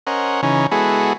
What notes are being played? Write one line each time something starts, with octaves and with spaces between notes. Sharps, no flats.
C#4 A#4 C5 D#5 F#5
C#3 E3 C#4 D#4
G#3 B3 E4 F#4 G#4 A4